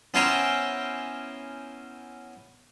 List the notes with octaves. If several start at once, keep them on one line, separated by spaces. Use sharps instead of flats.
B3 C#4 E4 C5 G5 A#5